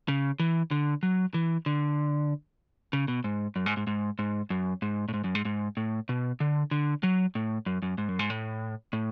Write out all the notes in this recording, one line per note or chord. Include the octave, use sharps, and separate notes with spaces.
C#3
E3
D3
F#3
E3
D3
C#3
B2
G#2
F#2
G#2
G#2
G#2
G#2
F#2
G#2
A2
G#2
F#2
G#2
G#2
A2
B2
D3
D3
F#3
A2
F#2
F#2
G#2
F#2
G#2
A2
A2